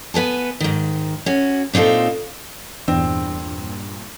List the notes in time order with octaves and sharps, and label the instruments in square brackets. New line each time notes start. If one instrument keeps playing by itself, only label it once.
[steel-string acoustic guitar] B3 B4 G#5 A5
G#2 D#3
C#4 F#4
A#2 C4 D#4 F4 A4
[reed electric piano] E2 [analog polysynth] G2 A#2 [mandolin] C4 [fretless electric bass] D4